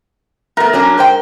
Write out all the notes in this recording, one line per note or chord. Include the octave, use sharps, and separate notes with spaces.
A3 B3 A#4
F#3 C#4 D4
G#2 C5 G5